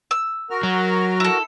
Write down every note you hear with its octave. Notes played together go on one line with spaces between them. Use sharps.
E6
F#4 A#4 F6
F#3
E4 A4